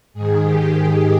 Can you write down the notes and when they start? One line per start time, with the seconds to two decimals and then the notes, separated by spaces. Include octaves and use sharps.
0.14 G#2 D#3 G#4
0.43 G4